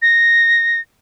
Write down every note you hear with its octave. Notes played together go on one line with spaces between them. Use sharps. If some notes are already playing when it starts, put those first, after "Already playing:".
A#6